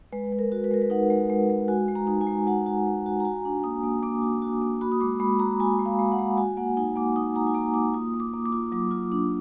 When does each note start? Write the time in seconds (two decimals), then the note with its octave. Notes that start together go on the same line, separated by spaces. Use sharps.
0.12 G#3 B4
0.32 G#3
0.39 A#4
0.52 F#4
0.64 B4
0.71 G#3 A#4
0.82 B4
0.90 D#4 F#5
1.10 G#3
1.30 G#3
1.50 G#3
1.68 F#4 G#5
1.88 G#3
1.95 A#5
2.07 D#4
2.21 G#5
2.27 G#3
2.47 F#4 F#5
2.66 F#4
2.86 G#3
3.06 F#4
3.20 A#5
3.25 F#4 G#5
3.45 D4
3.64 A#3 D#6
3.83 A#3
4.03 A#3 D6
4.22 F#4
4.42 F#4
4.62 A#3
4.81 F#4 B5
4.92 D#6
5.01 G#3 D6
5.20 G#3 B5
5.39 F#4 A#5
5.60 F#4 G#5
5.79 G#3
5.86 F5
5.99 G#3
6.12 F#5
6.19 G#3
6.37 F#4 G#5
6.57 A#3 F#5
6.77 D#4 G#5
6.96 A#3 D6
7.16 D#4 D#6
7.35 D#4 A#5
7.47 G#5
7.54 A#3 A#5
7.74 A#3 D6
7.94 F4 D#6
8.14 A#3
8.20 D6
8.34 A#3
8.45 D6
8.52 F4
8.72 F#3 D6
8.91 F4
9.12 D4